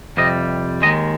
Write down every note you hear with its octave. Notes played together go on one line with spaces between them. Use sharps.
F2 C3 G3 D#5
D#2 D#3 G#3 D#5